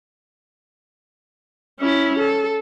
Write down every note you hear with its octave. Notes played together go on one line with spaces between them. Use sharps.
C#4 E4
A4